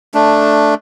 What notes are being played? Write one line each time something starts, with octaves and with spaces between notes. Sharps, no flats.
A3 D4